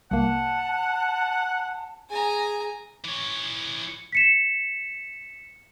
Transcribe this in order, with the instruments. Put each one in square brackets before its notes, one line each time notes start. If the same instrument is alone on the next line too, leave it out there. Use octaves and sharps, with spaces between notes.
[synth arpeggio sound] C2 A#3 [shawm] F#5 [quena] A5
[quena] G#4 [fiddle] G#5 A#5
[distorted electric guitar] E3 C#5
[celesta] B6 C#7 E7